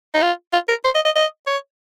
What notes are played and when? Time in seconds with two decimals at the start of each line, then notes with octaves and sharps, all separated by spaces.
0.14 D#4
0.22 F4
0.53 F4
0.68 A#4
0.84 C5
0.95 D#5
1.05 D#5
1.16 D#5
1.47 C#5